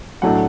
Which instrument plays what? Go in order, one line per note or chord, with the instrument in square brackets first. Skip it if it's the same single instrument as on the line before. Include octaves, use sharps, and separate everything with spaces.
[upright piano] B1 A2 F#3 A3 D4 F#5